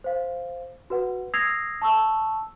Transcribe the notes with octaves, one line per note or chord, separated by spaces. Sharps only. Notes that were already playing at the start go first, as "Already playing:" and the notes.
C5 F5
F#4 B4 F#5
D#6 E6 G#6 A#6 C7 F7
A5 C#6 E6